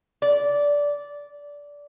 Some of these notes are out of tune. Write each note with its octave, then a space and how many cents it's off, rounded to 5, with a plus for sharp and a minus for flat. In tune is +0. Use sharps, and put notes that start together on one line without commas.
D5 -15